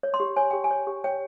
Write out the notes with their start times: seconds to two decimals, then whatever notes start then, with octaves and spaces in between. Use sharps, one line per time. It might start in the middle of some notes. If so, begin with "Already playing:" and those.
0.03 C#5
0.14 C6
0.20 G4
0.36 C#5 G#5
0.51 G4 G5
0.64 G#5
0.71 C#5
0.87 G4
1.04 C#5 G5